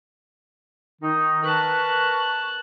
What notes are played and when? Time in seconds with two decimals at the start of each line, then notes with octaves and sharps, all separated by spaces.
1.02 D#3 D#4
1.43 A#4 B4 A5 C#6 F#6